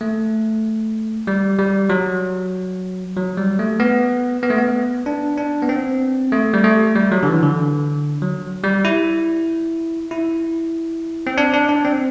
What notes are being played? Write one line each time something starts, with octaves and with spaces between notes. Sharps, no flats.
A3
G3
G3
F#3
F#3
G3
A3
B3
B3
A3
B3
D4
D4
B3
C4
A3
G3
A3
G3
F#3
D3
E3
D3
F#3
G3
E4
E4
C4
D4
D4
D4
C4